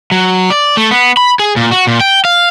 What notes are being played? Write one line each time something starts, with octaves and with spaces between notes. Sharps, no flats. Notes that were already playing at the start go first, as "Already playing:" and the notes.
F#3
D5
A3
B3
B5
G#4
A#2
F#4
A#2
G5
F5